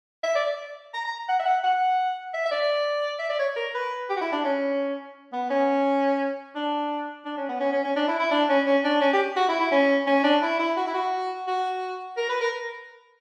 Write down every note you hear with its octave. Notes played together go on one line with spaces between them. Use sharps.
E5
D5
A#5
A#5
F#5
E5
F#5
F#5
E5
E5
D5
E5
D5
C#5
A#4
B4
G4
F#4
E4
D4
C#4
B3
C#4
D4
D4
C#4
B3
C#4
C#4
C#4
D4
E4
E4
D4
C#4
C#4
D4
C#4
G4
F#4
E4
E4
C#4
C#4
D4
E4
E4
F#4
E4
F#4
F#4
A#4
B4
A#4